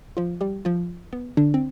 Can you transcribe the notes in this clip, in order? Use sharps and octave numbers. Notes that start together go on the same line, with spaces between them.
F3 F4
G3 G4
F3 F4
B3
D3 D4
C4